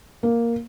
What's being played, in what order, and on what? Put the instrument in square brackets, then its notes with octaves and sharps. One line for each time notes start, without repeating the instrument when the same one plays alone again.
[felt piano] A#3